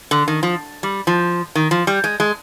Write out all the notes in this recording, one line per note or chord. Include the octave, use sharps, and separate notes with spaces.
D3
D#3
F3
G3
F3
D#3
F3
G3
G#3
G#3